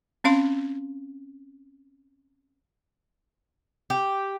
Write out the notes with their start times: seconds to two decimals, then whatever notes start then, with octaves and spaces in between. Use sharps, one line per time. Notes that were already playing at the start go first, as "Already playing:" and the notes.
0.24 C4 C#4 F5 C6
3.90 G4